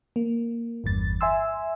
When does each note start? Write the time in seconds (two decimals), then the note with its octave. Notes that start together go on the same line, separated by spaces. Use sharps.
0.16 A#3
0.84 G1 E2 G2 A6
1.21 E5 G#5 C6 E6